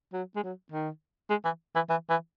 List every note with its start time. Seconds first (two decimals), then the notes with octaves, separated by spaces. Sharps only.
0.13 F#3
0.35 G#3
0.43 F#3
0.72 D#3
1.30 G#3
1.45 E3
1.75 E3
1.89 E3
2.09 E3